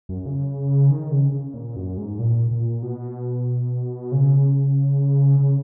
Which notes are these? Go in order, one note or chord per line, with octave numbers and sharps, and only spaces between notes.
F#2
C#3
D#3
C#3
C#3
A#2
F#2
G#2
A#2
A#2
B2
C#3
C#3